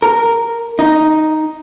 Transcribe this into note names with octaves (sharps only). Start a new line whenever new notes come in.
A#4
D#4